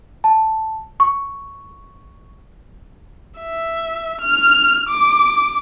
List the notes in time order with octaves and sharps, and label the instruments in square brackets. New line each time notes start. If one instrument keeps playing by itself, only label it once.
[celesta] A5
C#6
[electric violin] E5
F6
D6